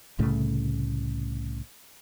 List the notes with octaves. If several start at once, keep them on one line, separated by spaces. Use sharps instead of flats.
C2 A2 C#3 A3